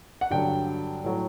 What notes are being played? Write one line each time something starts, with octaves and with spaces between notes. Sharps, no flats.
F#5
G2 D3 F#3 G5
A2 F#3